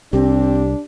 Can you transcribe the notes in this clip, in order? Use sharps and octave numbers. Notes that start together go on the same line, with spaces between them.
C2 C4 D4 G4